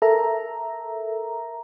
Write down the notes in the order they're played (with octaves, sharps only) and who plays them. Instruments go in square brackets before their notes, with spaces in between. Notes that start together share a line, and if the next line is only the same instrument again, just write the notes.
[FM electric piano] A4 A#4 E5 A#5